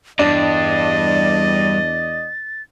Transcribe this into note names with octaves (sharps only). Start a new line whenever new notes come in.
E2 G2 D4 D5 D#5 A6